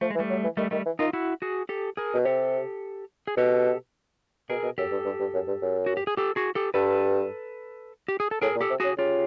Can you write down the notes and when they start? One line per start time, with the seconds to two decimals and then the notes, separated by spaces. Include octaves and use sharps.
0.01 F3 A3
0.10 G#3
0.15 E3
0.19 G3 A3
0.30 F#3
0.44 E3
0.57 D#3 G3 A3
0.71 D#3 G3 A3
0.86 E3
0.99 D#3 D#4 F4
1.13 E4 F#4
1.42 F#4 G#4
1.69 G4 A4
1.97 G#4 A#4
2.14 B2
2.25 C3 G4 A4
3.27 G#4
3.37 B2 G4 A4
4.50 B2 G#4 A#4
4.63 B2
4.78 F#2 G4 A4
4.92 G2
5.05 G2
5.20 G2
5.34 F#2
5.48 G2
5.62 F#2
5.86 F#4
5.97 G4
6.07 G#4
6.17 G4 A4
6.36 F#4 G#4
6.55 G4 A4
6.74 G2 A4 B4
8.08 G4
8.20 G#4
8.31 A4
8.42 A2 G#4 A#4
8.56 A#2
8.61 G4 A4
8.70 C3
8.80 C#3 F#4 G#4
8.98 C#3 F4 G4